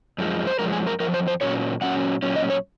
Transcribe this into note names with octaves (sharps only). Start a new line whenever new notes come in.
F#2 F3 G#3
C5
F#2 F3 G#3 A#4
G#4
A#4
F#2 F3 A#4
C5
C5
A#2 F#3 C#4 C#5
A#2 F#3 C#4 F#5
A#2 F#3 C#4
D#5
C#5